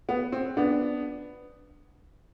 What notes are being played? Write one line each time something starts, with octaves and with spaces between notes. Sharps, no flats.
B3
C4
B3 D4